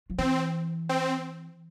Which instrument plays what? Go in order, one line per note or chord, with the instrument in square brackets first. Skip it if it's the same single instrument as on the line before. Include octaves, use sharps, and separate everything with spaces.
[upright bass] F3
[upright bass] E3 [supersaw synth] C4
[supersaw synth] C4